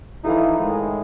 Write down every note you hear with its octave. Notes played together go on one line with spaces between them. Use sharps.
E3 F3 D#4 E4 A4 F5
A2 D#3 G#3